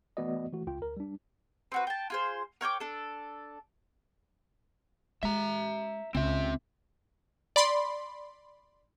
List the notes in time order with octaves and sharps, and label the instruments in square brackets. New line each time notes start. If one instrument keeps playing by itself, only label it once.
[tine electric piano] E3 A3 B3 F#4 D5 D#5
E3 A3 F#4
C#2 F4 G5
D2 A#4
G3 D4
[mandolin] C4 F#4 B4
G5 A5
F4 G#4 C5
A#4 C#5 G5 D6
D4 A4
[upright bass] G#3 [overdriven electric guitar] E5 A#5
[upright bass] C#2 [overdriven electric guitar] C4 E5
[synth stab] D5 B5 C6